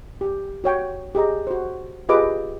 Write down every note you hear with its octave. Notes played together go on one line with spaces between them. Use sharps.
G4
F#4 C#5 G5
G4 G#4 D#5 A#5
F#4 C5
F4 G4 G#4 B4 D#5 D6